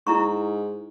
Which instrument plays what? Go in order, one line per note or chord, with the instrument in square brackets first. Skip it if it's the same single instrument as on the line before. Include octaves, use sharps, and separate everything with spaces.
[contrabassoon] G#2 [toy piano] E4 A#5 C#6